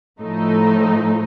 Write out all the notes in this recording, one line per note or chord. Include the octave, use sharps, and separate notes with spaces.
A2 F3 A3 D#4